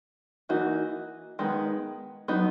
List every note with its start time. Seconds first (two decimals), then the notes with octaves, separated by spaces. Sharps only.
0.49 E3 A#3 D#4 F#4
1.39 D#3 G#3 B3
2.28 F#3 B3 D#4